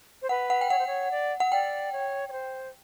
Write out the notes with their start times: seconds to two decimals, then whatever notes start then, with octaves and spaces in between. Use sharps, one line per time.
0.22 C5
0.29 B4 F#5
0.50 F#5
0.61 G5
0.70 C#5 F#5
0.79 C5
0.87 C#5
1.11 D5
1.40 F#5
1.52 D5 G5
1.92 C#5
2.29 C#5
2.32 C5